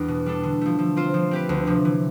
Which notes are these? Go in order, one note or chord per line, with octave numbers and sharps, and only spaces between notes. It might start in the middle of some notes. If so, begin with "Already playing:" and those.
Already playing: E2 G3 D4
B2
G3 D4 A4
D3
F3 A3
F3
C4 F4 C5
F3
C4 G4 B4
D2
C3 F3
E3